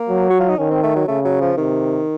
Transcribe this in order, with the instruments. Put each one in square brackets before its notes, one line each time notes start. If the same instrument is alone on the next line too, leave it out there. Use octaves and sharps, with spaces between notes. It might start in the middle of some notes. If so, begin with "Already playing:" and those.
Already playing: [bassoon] A#3
[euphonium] F#3
[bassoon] F#4
F4
D#4
[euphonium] D#3 [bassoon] C#4
[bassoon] C4
A3
F#3
[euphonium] C#3 [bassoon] A3
[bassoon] F#3
F3
[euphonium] C3 [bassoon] D#3